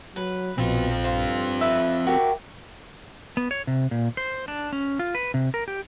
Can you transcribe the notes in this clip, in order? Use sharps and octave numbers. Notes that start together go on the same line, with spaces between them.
F#3 B4
A#1 B2 C4 F4
G2 C5 F5
B4 E5
F#4 G4 A#4
B3
C#5
C3
A#2
C5
D4
C#4
F4
B4
C3
A#4
G4